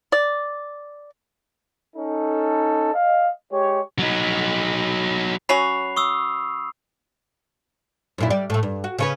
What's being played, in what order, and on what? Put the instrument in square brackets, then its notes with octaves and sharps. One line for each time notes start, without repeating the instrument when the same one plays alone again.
[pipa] D5
[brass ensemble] C#4 D#4 A4
D#5 F5
G#3 G4 C#5
[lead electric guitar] F#3 D#4
[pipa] F#3 C#4 F#4 [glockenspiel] B5 C7 F7
[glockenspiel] C#6 D#6 E6
[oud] F#2 A#2 E4
G3 D5
A2 A3
G2
F#4
C#3 C#4 B4